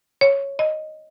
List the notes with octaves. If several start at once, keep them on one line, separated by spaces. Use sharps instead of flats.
C#5
D#5